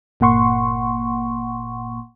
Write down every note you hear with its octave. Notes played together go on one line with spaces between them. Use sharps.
G1 A#2 A#3 F#5 C6 C#6